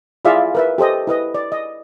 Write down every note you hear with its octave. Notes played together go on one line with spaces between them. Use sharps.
E4 F4 G#4 D5 E5 F5
A#4 B4 E5
G4 A4 C5 D#5
E4 B4 D#5
D5
D#5